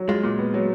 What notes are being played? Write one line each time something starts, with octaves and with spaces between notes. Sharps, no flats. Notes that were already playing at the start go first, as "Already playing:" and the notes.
Already playing: F#3
G#3 F4
A#2
B3
F#3